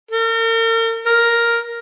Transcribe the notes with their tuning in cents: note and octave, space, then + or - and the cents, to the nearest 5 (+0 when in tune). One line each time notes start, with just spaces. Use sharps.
A#4 -40
A#4 +5